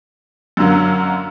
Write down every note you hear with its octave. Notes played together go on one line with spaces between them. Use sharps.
F#2 D3 F#3 A#3